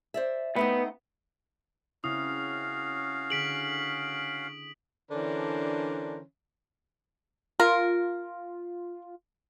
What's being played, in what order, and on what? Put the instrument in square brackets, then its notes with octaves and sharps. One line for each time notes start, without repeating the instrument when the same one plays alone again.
[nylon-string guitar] C5 D5 E5
[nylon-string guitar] A3 C4 D#4 [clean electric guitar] B3
[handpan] C#3 C4 E4 [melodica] C#4 F#4 F5 [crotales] D#6
[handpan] D3 G#4 [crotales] B6 D7 F#7
[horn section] D3 E3 C#4 D4 A#4 C5
[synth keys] F4 [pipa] A#4